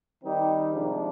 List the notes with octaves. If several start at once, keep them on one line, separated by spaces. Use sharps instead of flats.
D#3 G3 C4 D#4 G4
C3 F3 G#3 D4